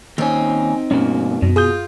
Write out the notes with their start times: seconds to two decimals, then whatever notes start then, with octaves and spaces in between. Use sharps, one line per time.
0.18 D#2 C4 C#4 D#4
0.91 G2 B2 A#3 C#4
1.42 F#2 B2
1.56 F4 G#4 D#6 G6